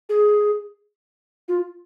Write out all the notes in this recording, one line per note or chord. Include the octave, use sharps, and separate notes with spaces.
G#4
F4